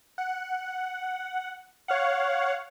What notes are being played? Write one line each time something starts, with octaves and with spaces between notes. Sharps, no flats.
F#5
C#5 F5 F#5